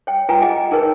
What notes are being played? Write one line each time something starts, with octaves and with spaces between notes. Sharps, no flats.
C#5 G5
F4 B4 G5 G#5 A#5
G#4 D#5 F#5 G#5
G5
D#4 G#4 A#4 B4 C#5